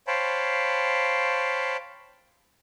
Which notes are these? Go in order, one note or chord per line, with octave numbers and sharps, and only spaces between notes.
C5 C#5 F5 G5 A5 B5